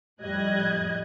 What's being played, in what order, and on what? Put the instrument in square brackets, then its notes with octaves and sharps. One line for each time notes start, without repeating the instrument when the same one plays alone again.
[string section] F2 A2 G3 D#5 F#6 G#6